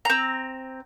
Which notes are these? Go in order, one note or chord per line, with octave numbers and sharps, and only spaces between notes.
C4 A#5